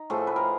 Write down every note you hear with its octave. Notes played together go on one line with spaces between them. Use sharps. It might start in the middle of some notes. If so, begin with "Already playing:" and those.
Already playing: D#4
A2 F3 A3 G#4
B4
A#4